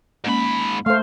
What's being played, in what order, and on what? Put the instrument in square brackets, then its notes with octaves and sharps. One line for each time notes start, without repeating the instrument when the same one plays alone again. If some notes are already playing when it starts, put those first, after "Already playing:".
[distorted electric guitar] G#2 B5 [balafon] G#3 A#3 C#4
[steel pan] A3 C5 [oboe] F5